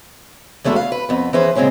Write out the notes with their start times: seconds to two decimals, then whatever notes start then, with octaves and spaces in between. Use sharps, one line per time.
0.64 E2 G#3 A3 F#4 A4 B4
0.76 F5
0.92 B4
1.09 F2 B3
1.33 E3 C#4 G#4 B4 C5
1.55 A#2 C#3 G#3 C4 C#4 G#4